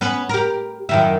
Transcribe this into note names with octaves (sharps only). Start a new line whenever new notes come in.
B3 C#4 B4
G4 A#4
F#2 D#3 E4